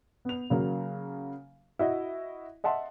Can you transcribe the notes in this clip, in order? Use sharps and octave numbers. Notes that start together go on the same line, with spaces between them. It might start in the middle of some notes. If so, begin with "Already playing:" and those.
B3 F7
C#3 F#3 A#3
E4 F#4 D#5
D#5 E5 F#5 A5 C6